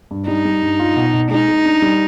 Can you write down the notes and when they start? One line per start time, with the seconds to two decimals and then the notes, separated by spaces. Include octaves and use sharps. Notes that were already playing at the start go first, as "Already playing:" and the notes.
0.11 G2
0.28 G3 D#4
0.45 G3
0.62 G2
0.79 F4
0.96 B2
1.14 B2
1.31 G#3 D#4
1.48 G#3
1.65 D4
1.82 G3